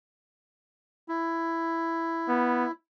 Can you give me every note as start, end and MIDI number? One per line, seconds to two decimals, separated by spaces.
1.08 2.71 64
2.28 2.65 59